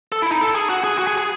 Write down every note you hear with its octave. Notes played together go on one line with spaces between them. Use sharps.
A4
E4
D#4
A4
G#4
F#4
G#4
F#4
G#4
G#4